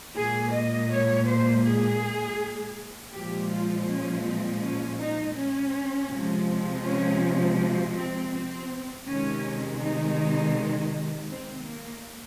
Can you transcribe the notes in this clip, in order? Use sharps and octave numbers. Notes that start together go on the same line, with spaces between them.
A#2 G#3 G#4
D#5
C#5
C5
G#4
A#2 F3 G#3 G4
F4
C#4
C4
C#4
D#4
C#4
C3 F3 G#3
C#4
C4
C4
C3 D#3 G#3 C#4
D#4
C4
A#3